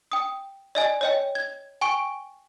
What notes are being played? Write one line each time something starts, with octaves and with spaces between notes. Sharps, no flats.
G5 D#6
D5 D#5 G#5
C#5 D#5 G5
G#6
G5 G#5 C#6 D7